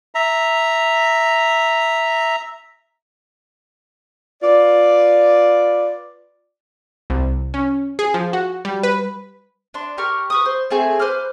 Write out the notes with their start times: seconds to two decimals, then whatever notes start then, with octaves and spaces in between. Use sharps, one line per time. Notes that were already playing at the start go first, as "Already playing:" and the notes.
0.15 E5 A#5
4.43 F4 B4 D5
7.10 C2
7.54 C#4
7.99 G#4
8.14 F3
8.33 F#4
8.65 G3
8.83 B4
9.74 D4 C6
9.98 G4 A#4 C#6 F6
10.30 B4 C#6 D#6
10.45 C5
10.70 A3 C4 G#4 G#5
10.99 B4 C5 D6 F6